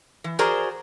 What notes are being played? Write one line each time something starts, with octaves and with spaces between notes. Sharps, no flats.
E3
F#4 G#4 A#4 C5 D5 A#5